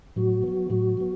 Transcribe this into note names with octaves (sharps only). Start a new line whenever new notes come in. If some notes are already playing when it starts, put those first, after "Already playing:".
A2 F#3 F#4
F#3 B3
A2 F#3 F#4
F#3 B3